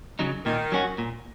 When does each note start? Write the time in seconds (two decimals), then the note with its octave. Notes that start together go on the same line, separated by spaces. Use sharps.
0.19 C#3 F#3 D#4
0.45 A#2 D#3
0.72 F#3 C#4 F#4
0.98 A#2